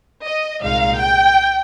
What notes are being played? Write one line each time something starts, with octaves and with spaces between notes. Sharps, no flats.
D#5
C2 A#2 G#3 D#4 F5
G5